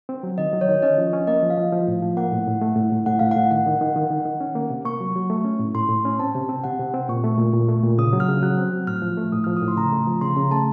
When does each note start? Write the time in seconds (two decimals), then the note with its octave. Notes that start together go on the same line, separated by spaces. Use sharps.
0.09 C4
0.23 F#3
0.38 D#3 D#5
0.53 F#3
0.61 C#5
0.68 D#3
0.82 C#4 D#5
0.98 F3
1.13 C#4
1.27 A#3 D#5
1.43 F3
1.50 F5
1.58 F3
1.72 F3
1.87 A2
2.02 F3
2.17 A#3 F#5
2.32 A2
2.47 A2
2.61 A3
2.76 A2
2.92 A2
3.06 A2 F#5
3.19 A2 F5
3.31 A2 F#5
3.51 D#3 F#5
3.66 D#3
3.81 D#3
3.96 D#3
4.10 D#3
4.25 D#3
4.40 C#4
4.56 A#3
4.70 C3
4.85 A#3 C#6
5.00 F#3
5.16 F#3
5.30 A3
5.44 C#4
5.59 A2
5.75 A2 C6
5.89 A2
6.05 C#4
6.19 C4 A5
6.35 C3
6.49 C4
6.64 C3 F#5
6.79 C3
6.94 C4
7.09 A#2 C#6
7.24 A3
7.38 A#2
7.53 A#2
7.68 A3
7.83 A#2
7.98 C#3 D#6
8.13 F#3
8.20 F6
8.28 C#3
8.43 F#3 F#6
8.58 C4
8.73 F#3
8.87 A2 F6
9.02 F3
9.17 A3
9.32 A2 D#6
9.44 F3 F6
9.57 D#6
9.62 A2
9.68 C6
9.77 C#3 A#5
9.92 A3
10.07 F3
10.21 C#3 C6
10.36 C#3 A#5
10.51 A3 A5